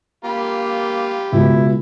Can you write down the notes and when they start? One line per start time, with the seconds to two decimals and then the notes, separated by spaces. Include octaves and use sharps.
0.25 A#3 F4 G4 B5
1.32 C#2 B2 E4